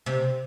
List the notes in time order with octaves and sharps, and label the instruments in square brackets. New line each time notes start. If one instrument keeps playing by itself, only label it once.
[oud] C3